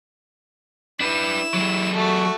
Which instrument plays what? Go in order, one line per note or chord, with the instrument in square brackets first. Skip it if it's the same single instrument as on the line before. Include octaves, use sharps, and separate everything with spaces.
[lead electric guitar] D4 B4 [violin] E4 E7
[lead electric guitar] F#3 G#3
[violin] A3 F#4